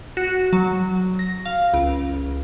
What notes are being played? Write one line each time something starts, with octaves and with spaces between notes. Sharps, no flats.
F#4
F#3
A#6
F5
C#2